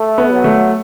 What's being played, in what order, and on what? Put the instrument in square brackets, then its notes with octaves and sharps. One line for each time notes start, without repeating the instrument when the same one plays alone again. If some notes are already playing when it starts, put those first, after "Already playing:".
Already playing: [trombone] A3
[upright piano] B3
[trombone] F#3
[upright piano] A3